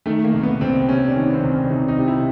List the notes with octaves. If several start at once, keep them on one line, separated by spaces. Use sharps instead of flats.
D#3 A3
A#3
C2
B3
C2 C4
C3 C#4
D4
D#3 C#4
B3
C4
C2
C#4
D4
C2 D#4
D#4
C3
E4